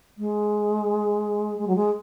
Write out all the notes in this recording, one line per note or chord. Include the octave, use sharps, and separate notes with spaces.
G#3
G#3
F#3
G#3